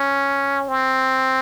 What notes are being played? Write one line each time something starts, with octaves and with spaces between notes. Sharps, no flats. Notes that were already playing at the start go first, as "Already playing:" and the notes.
Already playing: C#4
C4